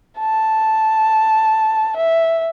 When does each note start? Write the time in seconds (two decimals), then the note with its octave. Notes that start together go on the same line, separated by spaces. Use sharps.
0.19 A5
1.97 E5